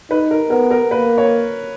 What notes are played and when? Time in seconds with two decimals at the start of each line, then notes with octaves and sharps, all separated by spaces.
0.11 D#4 B4
0.31 A#4
0.50 B3 A#4
0.71 A#4
0.91 A#3 B4
1.18 C#5